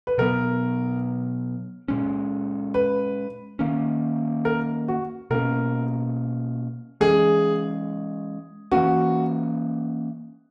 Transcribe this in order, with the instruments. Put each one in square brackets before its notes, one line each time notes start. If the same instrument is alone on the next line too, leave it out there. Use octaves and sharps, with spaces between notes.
[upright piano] B4
[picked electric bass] B2 F#3 B3 [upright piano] A#4
[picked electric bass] A#2 G#3 C#4
[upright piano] B4
[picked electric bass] D#3 A#3 C#4
[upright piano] A#4
F#4
[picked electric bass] B2 A#3 C#4 [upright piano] A#4
[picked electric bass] E3 G#3 C#4 [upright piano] G#4
[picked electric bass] E3 A#3 C#4 [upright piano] F#4